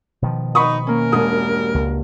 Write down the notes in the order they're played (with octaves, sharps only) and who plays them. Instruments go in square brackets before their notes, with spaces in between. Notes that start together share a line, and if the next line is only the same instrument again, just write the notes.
[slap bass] B2 D#3 F3
[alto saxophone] D#4 [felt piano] B5 C#6 D#6
[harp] A#3 C#4 [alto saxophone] A#4
[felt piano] E1 D#6 [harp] G2 F#3
[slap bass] C#2